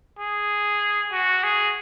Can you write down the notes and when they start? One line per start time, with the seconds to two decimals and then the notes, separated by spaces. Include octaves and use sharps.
0.19 G#4
1.12 F#4
1.43 G#4